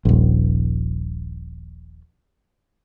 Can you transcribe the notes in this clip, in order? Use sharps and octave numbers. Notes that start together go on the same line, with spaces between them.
D#1 A#1